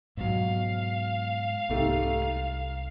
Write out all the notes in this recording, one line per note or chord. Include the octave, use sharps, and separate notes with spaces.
G#2 B2 F#3 F5
C2 G#2 A3 G4
F7